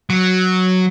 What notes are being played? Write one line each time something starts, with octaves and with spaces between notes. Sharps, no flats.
F#3